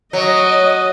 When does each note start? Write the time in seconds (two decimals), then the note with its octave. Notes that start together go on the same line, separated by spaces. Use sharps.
0.13 F#3 D#5